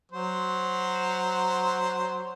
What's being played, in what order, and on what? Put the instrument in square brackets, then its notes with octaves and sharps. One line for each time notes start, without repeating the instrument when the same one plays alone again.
[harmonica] F#3 C5